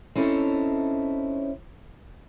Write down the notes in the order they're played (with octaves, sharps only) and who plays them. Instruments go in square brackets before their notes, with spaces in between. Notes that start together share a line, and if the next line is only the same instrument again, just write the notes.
[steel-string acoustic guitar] C4 C#4 D#4 E4 A4 C#5